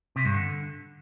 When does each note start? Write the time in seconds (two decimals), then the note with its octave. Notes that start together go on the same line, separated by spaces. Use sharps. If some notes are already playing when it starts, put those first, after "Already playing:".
0.16 C3
0.25 G2
0.34 D3